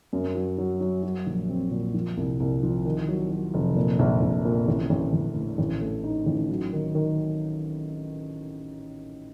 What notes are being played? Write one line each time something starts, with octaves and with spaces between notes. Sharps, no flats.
F#2
F#3
F#3
F#3
F#3
A#1
C4
A#2
F3
C2
C2
F3
D#3
F#3
F#3
F1
A#2
A#1
A#1
A#2
A1
A1
A1
A2
A1
A3
D#4
A1
F#3
D#3
D#3